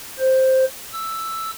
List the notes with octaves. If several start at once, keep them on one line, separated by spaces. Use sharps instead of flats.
C5
E6